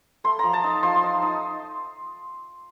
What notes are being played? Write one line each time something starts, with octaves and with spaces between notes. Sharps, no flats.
A3 C6
F3 A#5
A5
D#4
F3 C6
D#4
D#4